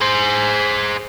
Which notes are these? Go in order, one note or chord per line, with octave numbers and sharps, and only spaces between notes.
G#4 C5